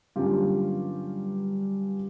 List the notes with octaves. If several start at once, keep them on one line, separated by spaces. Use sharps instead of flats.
G2 D3 F#3 A#3 C#4 F4 G4